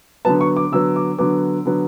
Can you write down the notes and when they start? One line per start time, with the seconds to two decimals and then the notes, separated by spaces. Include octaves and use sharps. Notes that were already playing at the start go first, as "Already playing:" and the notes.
0.25 D3 F#3 B3 A5
0.41 C#6
0.57 D6
0.72 D3 F#3 B3 E6
0.96 D6
1.18 D3 F#3 B3 D6
1.65 D3 F#3 B3